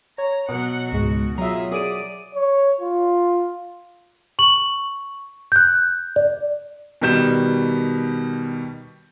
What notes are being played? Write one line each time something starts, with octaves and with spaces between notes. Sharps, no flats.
C#5 A#5
B2 F#3 F#5
C#2 G#2 G#3 F#4
F#3 F4 G#4 E5 A#5
G#4 D5 D#6 D7 D#7
C#5
F4
C#6 F#7
F#6 G6
D5
B2 D#3 G3 G6 E7